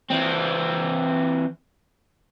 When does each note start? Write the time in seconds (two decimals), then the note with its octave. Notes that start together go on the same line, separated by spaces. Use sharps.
0.11 E3 C4